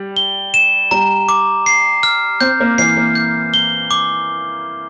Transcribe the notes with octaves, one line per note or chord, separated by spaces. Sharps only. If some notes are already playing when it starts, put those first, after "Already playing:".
Already playing: G3
G7
E7
G3 A#5
D6
C7
F6
C4 G6
A#3
E3 C7
A#3
G6
G7
D6